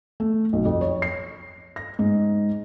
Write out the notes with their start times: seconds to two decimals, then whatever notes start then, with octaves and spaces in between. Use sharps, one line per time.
0.20 A3
0.53 B1
0.65 F2
0.81 C#5
1.02 C7
1.76 A#6
1.99 G#2